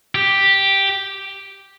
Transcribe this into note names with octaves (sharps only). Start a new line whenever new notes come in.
G4